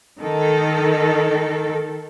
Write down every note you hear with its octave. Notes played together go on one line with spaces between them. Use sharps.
D#3 A4